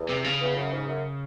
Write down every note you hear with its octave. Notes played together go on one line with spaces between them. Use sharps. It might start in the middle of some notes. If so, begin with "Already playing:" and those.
Already playing: E2
C3
C#3
E2
F#2
G#2
F#2